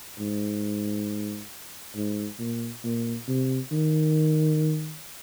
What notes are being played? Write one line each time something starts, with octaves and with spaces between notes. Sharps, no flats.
G#2
G#2
A#2
A#2
C3
D#3